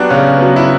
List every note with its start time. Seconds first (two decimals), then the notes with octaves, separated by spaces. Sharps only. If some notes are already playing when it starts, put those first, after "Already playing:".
Already playing: F#3 B3 D4 F#4 G4
0.10 C#3 C#4
0.37 F#3 B3
0.56 E4